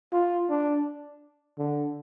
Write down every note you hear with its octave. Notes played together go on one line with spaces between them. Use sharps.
F4
D4
D3